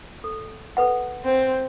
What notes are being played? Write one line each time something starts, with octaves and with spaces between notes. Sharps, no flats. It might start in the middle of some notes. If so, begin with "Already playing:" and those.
A4
A4 B4 F#5
C4